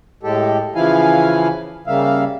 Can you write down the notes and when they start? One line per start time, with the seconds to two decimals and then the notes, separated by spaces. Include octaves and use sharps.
0.23 A2 G#3 G4 A4
0.75 C#3 E3 F3 E4 F5 G#5
1.87 C#3 G3 A#3 E5 F5